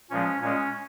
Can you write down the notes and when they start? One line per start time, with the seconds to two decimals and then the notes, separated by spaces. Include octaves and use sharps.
0.10 A#2 F3 G#3 C#4
0.41 A#2 G#3 C#4